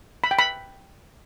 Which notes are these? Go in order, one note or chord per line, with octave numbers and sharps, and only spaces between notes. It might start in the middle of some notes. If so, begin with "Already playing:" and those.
B5
G5
B5